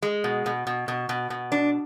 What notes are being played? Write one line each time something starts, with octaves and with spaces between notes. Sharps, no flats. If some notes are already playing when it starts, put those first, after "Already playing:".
G#3
B2
B2
B2
B2
B2
B2
D4